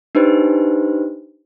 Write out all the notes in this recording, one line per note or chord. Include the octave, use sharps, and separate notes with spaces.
D4 D#4 G4 B4 C5